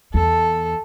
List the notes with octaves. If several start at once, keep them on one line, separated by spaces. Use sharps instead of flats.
E2 A4